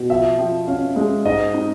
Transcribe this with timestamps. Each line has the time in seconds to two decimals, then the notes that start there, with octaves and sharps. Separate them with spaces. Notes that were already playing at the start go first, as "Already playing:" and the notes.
Already playing: B2
0.09 F3 E5
0.38 F3
0.67 C#4 F5
0.96 G#3
1.25 G#2 D#5
1.54 D#4